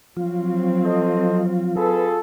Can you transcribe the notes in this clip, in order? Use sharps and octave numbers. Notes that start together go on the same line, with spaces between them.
F3 F#3 C4 F4
A4 C5 D#5
F4 G#4 A4 B4